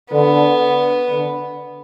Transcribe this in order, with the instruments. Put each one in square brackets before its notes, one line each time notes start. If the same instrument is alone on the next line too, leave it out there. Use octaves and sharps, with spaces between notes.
[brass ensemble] D3 [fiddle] B3
[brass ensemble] D3